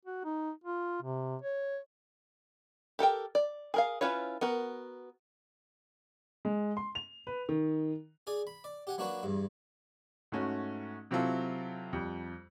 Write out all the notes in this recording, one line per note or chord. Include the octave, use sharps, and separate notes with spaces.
F#4
D#4
F4
C3
C#5
G4 A4 A#4 G5
D5
G#4 A#4 F5
C#4 E4 F4 B4 C#5
B3 F#4 A#4
G#3
C6
F7
B4
D#3
G#4 D5 G#5
B5
D5
G4 F#5 G#5
F#3 A#3 D4 F#4 B4 C#5
E2 G2
G#2 A3 C#4 F#4
C3 F#3 C4 E4 F4 A4
F2 G3